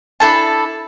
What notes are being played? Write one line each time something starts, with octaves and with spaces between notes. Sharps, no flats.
D4 E4 A4 A5